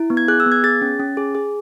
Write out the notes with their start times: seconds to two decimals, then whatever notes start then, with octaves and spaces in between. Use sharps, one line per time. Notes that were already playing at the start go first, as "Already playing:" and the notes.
Already playing: E4
0.10 B3
0.17 G#6
0.28 G#4 F#6
0.40 E6
0.46 B3
0.52 G#6
0.64 G#4 A6
0.82 C#4
0.99 C#4
1.17 G#4
1.35 G#4